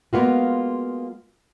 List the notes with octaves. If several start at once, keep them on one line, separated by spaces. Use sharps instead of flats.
G#3 A#3 B3 F4 F#4